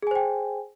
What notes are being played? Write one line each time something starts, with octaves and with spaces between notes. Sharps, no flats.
G#4 C5 G5 G#5